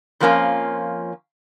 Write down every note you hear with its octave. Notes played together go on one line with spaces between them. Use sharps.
F2 F3 A#3 C#4 F4